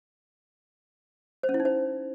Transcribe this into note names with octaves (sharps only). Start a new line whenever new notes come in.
C5
C#4
E4
D#4
C5